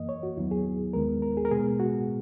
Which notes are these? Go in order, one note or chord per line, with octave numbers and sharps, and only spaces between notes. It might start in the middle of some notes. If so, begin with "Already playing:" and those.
Already playing: F#2 E3 A#3 D#5
C#5
F#4
D#2 D#3 F#3 B3 E4
G#4
D#2 D#3 G#3 B3 A#4
A#4
G#4
A#4
B2 G#3 B3 G#4
F#4